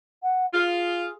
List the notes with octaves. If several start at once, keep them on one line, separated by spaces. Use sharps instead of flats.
F#5
F4 G#4